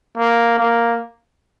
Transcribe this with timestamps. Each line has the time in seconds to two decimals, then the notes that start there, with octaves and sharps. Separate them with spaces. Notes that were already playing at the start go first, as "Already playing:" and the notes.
0.18 A#3
0.58 A#3